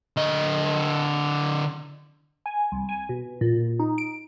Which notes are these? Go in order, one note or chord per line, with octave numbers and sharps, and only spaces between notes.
D3 D#5
G#5
C2
G#5
B2
A#2
D#4
D7